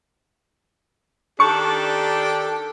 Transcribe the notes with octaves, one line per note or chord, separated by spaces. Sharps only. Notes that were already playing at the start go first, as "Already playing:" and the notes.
D#3 D4 G4 A4 C#6